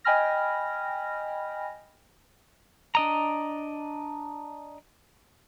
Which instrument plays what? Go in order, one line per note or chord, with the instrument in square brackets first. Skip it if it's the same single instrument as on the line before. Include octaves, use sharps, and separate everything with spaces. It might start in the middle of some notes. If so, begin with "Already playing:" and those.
[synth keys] D#5 G5 G#5 B5 F6 A#6
[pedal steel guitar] D4 D#5 A#5